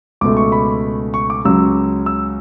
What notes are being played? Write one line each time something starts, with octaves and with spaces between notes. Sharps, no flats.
C#2 B2 A3 D6
C#6
B5
C#6
D6
C#2 C#3 F#3 E6
E6